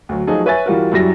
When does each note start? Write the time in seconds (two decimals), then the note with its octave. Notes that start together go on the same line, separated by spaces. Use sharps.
0.09 D2 F#3
0.27 F3 F#3 A3 D#4 G#4 A4
0.46 B4 C#5 E5 G#5 A6
0.66 E3 G3 F4 F#4 A#4
0.92 F#2 F#3 G3 E4 A#6